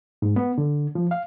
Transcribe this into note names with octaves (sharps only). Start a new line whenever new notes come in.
G#2
B3
D3
F3
F5